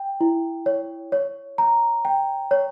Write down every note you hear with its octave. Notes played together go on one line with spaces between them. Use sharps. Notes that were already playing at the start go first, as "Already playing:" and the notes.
Already playing: G5
E4
C#5
C#5
A#5
G5
C#5